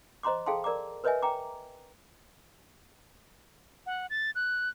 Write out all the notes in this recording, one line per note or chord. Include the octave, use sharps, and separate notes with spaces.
C5 D#5 A#5 C6 D6
G#4 A4 F5 G5 A5 C6
A#4 D5 A#5 D6
A#4 B4 C#5 D#5 E5 G#5
G5 A#5 D6
F#5
A6
F#6